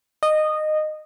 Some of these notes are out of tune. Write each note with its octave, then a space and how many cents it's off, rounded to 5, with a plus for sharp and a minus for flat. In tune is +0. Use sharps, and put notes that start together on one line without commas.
D#5 -15